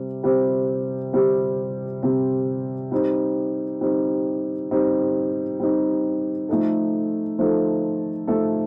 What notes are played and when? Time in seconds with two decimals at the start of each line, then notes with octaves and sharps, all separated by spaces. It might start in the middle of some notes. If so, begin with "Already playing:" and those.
Already playing: C3 G3 C4
0.23 C3 G3 C4 G4
1.13 C3 G3 C4 G4
2.03 C3 G3 C4 G4
2.92 G3 C4 D#4
3.81 G3 C4 D#4
4.71 G3 C4 D#4
5.60 G3 C4 D#4
6.49 F3 A3 D#4 A4
7.39 F3 A3 D#4 A4
8.27 F3 A3 D#4 A4